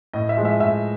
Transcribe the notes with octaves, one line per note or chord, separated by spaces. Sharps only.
A2 D#5
E5
F3 G#3
E5
A2 E5